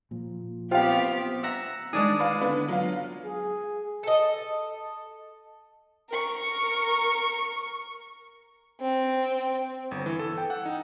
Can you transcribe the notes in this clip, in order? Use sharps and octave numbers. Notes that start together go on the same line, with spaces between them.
A#2 F3
B3 C4 F4 G4 C5 F5 G5
E5 F#5 A#5
D#3 G#3 D4 G#4 A6
B4 D5 F5
D3 B3 B4
F#3 F4 F5
G#4
A4 D#5
A#4 C#6
C4
G1
E3
A4
G5
F#5
D#4